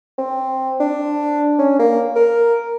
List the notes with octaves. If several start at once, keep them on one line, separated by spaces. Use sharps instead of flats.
C4
D4
C#4
A#3
A#4